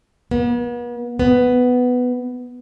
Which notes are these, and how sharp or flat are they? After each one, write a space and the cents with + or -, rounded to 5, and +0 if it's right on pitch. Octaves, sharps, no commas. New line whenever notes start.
B3 -40
B3 +10